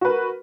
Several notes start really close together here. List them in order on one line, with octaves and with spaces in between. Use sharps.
F#4 B4 A#4